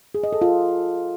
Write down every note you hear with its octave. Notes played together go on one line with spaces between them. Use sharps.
G#4
D#5
A4
F4